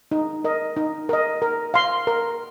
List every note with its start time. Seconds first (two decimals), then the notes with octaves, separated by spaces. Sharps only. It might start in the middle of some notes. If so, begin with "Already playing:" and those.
0.11 D#4
0.44 A#4 D#5
0.77 D#4
1.09 A#4 D#5
1.42 A#4
1.74 F5 C6
2.07 A#4